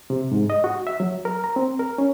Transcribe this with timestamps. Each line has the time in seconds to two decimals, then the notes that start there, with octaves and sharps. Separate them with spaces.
0.10 C3
0.32 G#2
0.50 D#5
0.64 F#4
0.87 E5
1.00 F#3
1.25 A#4
1.44 A#5
1.56 C4
1.79 A#4
1.98 C#4